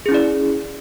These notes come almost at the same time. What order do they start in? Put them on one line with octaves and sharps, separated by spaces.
G#4 C#4 E4 D5